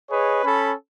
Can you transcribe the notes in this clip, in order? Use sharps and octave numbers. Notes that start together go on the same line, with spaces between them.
G#4 B4 C#5 D#5
C#4 A4 B5